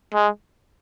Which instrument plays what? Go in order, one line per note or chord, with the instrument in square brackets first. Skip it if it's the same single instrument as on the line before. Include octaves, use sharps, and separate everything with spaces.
[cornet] G#3